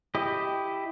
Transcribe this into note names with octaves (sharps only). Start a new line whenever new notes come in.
E4 G4 D#5